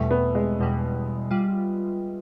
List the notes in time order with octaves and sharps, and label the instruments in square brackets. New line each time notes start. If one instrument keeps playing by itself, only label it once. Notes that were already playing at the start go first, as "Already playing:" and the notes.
Already playing: [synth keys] E2 B2 G3 [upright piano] A3
[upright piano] B3
G#3
[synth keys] E2 B2 G3
G3 F4